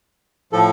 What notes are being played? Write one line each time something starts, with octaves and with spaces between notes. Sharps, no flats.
A2 F3 A4